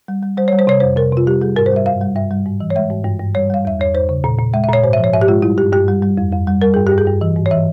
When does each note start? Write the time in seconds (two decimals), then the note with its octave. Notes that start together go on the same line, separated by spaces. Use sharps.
0.08 G3
0.23 G3
0.37 G3 C5
0.48 G3 C#5
0.59 C5
0.67 C3 C#5
0.80 F2 C5
0.97 C3 A#4
1.12 C3 F4
1.27 G3 G4
1.41 G3 G#4
1.56 G#2 A#4
1.66 C5
1.72 G3 E5
1.86 G2 F5
2.01 G3
2.16 G2 E5
2.31 G3
2.46 G#2
2.60 E3
2.70 C#5
2.76 G#3 E5
2.91 G#2
3.05 G2
3.19 G2
3.35 G3 C#5
3.50 G3 F5
3.65 E2 E5
3.80 E2 C#5
3.94 E2 C5
4.09 C#3
4.24 A#2
4.38 A#2
4.53 G#3 E5
4.64 E5
4.69 A#2 C#5
4.83 G#2 C5
4.93 E5
4.98 F3
5.04 C#5
5.13 G#2 E5
5.21 G4
5.28 G#3 F4
5.42 G3 E4
5.58 G2 G4
5.73 G2 G4
5.88 G3
6.02 G3
6.18 F2
6.32 F2
6.47 G3
6.62 G3 A#4
6.74 G2 G#4
6.87 G4
6.92 G2
6.98 G#4
7.07 G2
7.21 E3
7.36 G#2
7.46 C#5
7.51 E3 E5